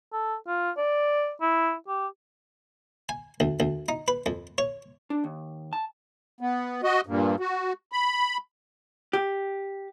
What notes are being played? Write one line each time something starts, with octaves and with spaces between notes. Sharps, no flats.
A4
F4
D5
E4
G4
G#5
D2
D2
D#4
B4
F2
C#5
D4
D#2
A5
B3
F#4 D#5
G2 A#2
F#4
B5
G4